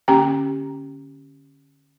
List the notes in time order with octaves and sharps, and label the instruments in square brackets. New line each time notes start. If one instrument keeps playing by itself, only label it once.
[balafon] D3 A#3 C#4 G4 G5 A#5